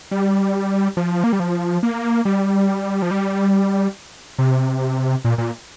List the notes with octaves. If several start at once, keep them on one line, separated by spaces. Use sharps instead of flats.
G3
F3
A#3
G3
F3
A#3
G3
F3
G3
C3
A#2
A#2